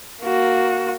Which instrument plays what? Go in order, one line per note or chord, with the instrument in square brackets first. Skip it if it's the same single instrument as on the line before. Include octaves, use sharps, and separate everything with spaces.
[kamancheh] A#3 F#4